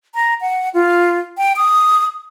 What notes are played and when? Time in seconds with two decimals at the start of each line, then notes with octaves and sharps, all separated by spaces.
0.15 A#5
0.41 F#5
0.74 F4
1.37 G5
1.56 D#6